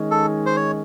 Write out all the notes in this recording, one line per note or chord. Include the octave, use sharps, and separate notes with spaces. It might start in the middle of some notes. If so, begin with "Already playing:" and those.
Already playing: D#3 G#3 C#4
A4
C5
C#5